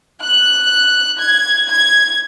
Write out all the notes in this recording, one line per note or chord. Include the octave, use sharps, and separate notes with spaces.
F#6
G#6
G#6